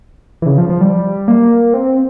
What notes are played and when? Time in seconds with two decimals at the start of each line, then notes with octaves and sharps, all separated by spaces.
0.42 E3
0.46 C#3
0.58 F3
0.70 F3
0.81 G3
1.28 A#3
1.74 C4